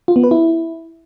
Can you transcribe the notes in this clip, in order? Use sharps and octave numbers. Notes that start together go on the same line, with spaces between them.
F4
B3
B4
E4